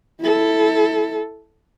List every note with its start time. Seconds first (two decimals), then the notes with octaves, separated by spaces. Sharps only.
0.21 E4 A4